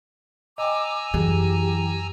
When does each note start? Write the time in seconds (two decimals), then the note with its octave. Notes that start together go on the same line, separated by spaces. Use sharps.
0.58 D#5 G5 G#5 A#5 D6 E6
1.14 F#2 E3 F#3 G4 G#4